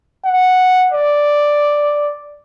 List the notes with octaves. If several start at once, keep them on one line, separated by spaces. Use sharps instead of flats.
F#5
D5